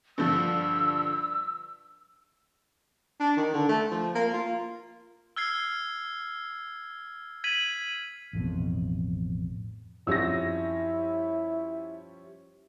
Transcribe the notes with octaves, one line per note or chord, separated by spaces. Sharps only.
G2 D3 F3 E6
D4
D#3
D3
A3
F3
A#3
F4
E6 F6 G#6 C7
G#6 B6 D#7 F#7
A1 F2 B2
F#2 F3 G3 C4 C#4 E4 E6 A#6